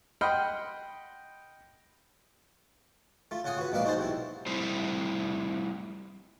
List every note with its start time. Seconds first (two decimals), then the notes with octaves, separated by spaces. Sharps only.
0.21 D#5 F#5 G5 B5 C6 F6
3.31 A3 F4
3.44 C#3 F4 F#5 G#5 D#6
3.58 F#4 B4
3.72 A#1 G#3 A#3 D4 B4 F5
3.85 D#4 F#4 G#4 C5 A5
3.97 B1 C3 E4
4.46 G3 A3 C4 E4 C5